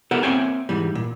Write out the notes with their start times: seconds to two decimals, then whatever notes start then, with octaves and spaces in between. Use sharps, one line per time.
0.11 B3 G4 A4 A#4 E5 F#5
0.23 A#3 C4 C#5 E5 G5 G#5
0.69 G#2 E3 G3
0.95 A#2